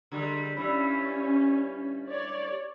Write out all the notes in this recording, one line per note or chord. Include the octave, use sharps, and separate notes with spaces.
D3 G3 G#3
G2 G3 C#4 E4
C#5 D5